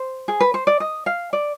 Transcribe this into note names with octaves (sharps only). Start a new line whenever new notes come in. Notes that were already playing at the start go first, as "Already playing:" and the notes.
Already playing: C5
G#4
B4
C5
D5
D#5
F5
D5